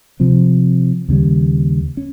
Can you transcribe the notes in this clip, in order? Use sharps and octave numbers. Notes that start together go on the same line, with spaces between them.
C3 F3 C4
D#2 C#3 G3
C#4